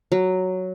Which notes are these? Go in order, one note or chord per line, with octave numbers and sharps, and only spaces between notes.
F#3